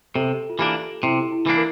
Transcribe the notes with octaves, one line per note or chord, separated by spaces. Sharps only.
C3 A4
F4
E3 A#3 D4 G4
C3 E4
E4
E3 A#3 D4
A#4